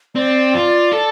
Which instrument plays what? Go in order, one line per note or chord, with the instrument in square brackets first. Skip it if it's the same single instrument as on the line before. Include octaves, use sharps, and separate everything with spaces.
[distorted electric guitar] C4 [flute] D5
[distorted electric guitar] F4
A4